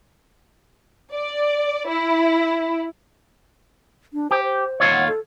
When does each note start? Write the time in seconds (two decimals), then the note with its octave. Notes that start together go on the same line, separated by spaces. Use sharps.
1.13 D5
1.87 E4
4.14 D4
4.31 G4 C5
4.43 C5
4.80 D#2 F4 C#5
4.91 F#5
5.08 A4